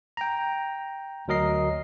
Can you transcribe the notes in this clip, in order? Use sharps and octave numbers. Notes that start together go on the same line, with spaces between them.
G5 A#5
D2 F#3 A#4 D#5 C7